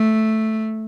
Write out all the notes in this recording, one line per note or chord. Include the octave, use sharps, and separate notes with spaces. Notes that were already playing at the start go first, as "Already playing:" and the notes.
Already playing: A3